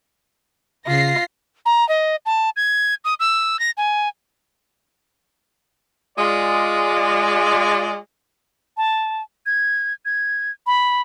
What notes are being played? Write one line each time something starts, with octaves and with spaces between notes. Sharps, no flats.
C#3 F4 A#6 C7
A#5
D#5
A5
G#6
D#6
E6
A#6
G#5
G#3 F4 D5
A5
G#6
G#6
B5